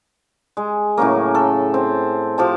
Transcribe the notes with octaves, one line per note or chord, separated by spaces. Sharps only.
G#3
A2 C#3 F#3 A#3
A4
C4
F3 G4 A5